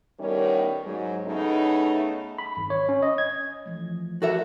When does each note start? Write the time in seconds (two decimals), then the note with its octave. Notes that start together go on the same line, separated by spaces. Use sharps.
0.20 A2 D#3 G3 B3 C#4 A#4
0.85 G#2 F#3
1.26 A2 C#3 A3 B3 D#4
2.38 B5
2.57 G#1
2.70 C#5
2.89 C#4
3.02 D#5
3.18 G#6
3.66 E3 F3 A3
4.22 F#4 A4 A#4 C5 E5